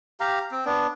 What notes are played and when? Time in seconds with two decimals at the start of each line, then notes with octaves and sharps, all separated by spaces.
0.20 G4 F5 A#5
0.52 C4
0.65 B3 D4